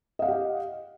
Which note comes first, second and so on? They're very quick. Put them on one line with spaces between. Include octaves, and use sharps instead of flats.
D#5 F5 F#5 G4